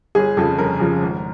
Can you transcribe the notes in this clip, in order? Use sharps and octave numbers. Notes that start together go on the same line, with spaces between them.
G1 G#4
F2 C#3 F3 A4
G1 A#4
F2 C#3 F3
G#1